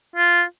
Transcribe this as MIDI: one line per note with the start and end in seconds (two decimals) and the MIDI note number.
0.16 0.42 65